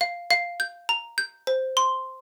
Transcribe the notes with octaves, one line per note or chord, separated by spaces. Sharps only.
F5
F5
G6
A#5
G6
C5
C6